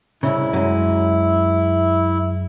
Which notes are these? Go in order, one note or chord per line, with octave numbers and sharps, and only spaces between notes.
C2 G2 C#3 E4
F#2 G#3